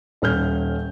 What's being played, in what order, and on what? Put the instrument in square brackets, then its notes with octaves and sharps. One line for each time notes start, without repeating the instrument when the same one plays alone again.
[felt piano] D#1 C#4 F6 G6